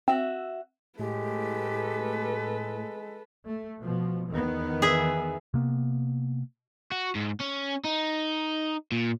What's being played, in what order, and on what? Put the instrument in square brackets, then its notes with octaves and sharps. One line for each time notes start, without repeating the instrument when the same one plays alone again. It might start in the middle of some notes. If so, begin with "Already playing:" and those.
[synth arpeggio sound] C4 [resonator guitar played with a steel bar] F#4 E5
[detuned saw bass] A2 [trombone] G#3 [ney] G4 [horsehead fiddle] A4 B4
[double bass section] A3
B2 F3
E2 D#3 B3
[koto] G#4 E5
[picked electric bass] C3 A#3 B3
[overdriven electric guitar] F#4
G#2
C#4
D#4
A#2